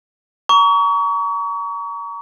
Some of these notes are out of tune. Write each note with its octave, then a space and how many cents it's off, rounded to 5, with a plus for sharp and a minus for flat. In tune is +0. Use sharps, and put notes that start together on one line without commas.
A#5 +0 C#6 +35